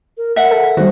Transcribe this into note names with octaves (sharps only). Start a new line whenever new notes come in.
A#4
A#4 E5 F#5
A4
D#3 G3 F#4 C5